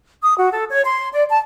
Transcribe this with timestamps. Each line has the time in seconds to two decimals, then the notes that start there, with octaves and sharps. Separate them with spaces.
0.22 D#6
0.36 F#4
0.51 A4
0.69 C#5
0.84 C6
1.12 D5
1.29 A5